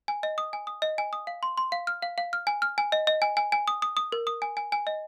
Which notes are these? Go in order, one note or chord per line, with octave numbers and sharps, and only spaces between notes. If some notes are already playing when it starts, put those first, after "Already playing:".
G#5
D#5
D#6
G#5
D#6
D#5
G#5
D#6
F5
C6
C6
F5
F6
F5
F5
F6
G#5
F6
G#5
D#5
D#5
G#5
G#5
G#5
D#6
D#6
D#6
A#4
D#6
G#5
G#5
G#5
D#5